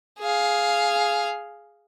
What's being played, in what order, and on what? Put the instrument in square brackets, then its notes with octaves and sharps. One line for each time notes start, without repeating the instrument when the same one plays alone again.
[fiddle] G#4 F5